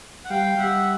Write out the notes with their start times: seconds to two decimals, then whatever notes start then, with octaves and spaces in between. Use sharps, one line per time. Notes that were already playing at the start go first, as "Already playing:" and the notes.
0.24 F#5
0.30 G3 F5 G5
0.58 G3 E5 F#5